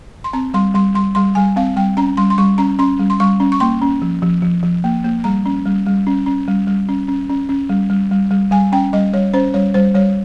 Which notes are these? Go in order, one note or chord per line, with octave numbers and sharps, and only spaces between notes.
C6
C4 A#5
G3 C6
G3 C6
G3 C6
G3 C6
G3 G#5
C4 F5
G3 G5
C#4 A#5
G3 C6
C6
G3 C#6
C#4 A#5
C#4 C6
G3
C6
G3 C#6
C#4
C#6
A#3 C6
C#4
F3
F3
F3
F3
A#3
A#3
G3 A#5
C#4
G3
G3
C#4
C#4
G3
G3
C#4
C#4
C#4
C#4
G3
G3
G3
G3
G3 G#5
C#4 G5
G3 D#5
G3 C#5
C#4 C5
G3 C#5
G3 C5
G3 C#5